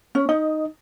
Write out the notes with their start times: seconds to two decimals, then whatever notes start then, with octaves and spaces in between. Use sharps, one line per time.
0.15 C#4
0.29 D#4 D#5